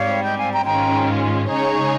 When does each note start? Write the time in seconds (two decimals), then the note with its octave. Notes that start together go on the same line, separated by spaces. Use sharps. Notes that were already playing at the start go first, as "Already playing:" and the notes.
Already playing: G#2 G3 C4 C#5 F5
0.23 D#5 G5
0.38 F5 G#5
0.51 G5 A#5
0.65 G#2 D#3 G#3 C#4 F4 G5 A#5
1.49 C#3 G#3 D#4 G#4 C#5 A#5 C#6